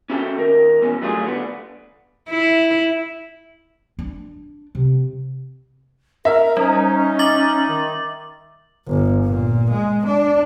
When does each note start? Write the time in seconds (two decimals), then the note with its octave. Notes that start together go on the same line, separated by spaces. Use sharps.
0.10 C#4 E4 F#4 A4 E5 G5
0.37 D#2 A#4
0.81 E2 B2 C#4
1.02 F#3 G3 A3 F4 F#4 G#4
1.23 D3 B3
2.30 E4
3.99 D4
4.75 C3
6.25 A#4 E5
6.57 G3 C#4 D#4
7.19 D6 A6 F#7
7.68 D#3
8.87 G1
9.23 A#2
9.71 G#3
10.06 D4